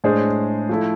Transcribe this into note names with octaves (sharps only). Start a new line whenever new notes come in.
A2 G#3 D4 G#4 C5
F3 A3 E4